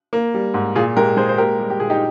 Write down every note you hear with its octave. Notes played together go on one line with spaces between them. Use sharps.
A#3
G3
G#2
A#2 F4 G#4
G#3 G4 A#4
G#3 G#4 C5
C5
A#3 G4 A#4
G3
G4
A#2 G#4
D#4 G4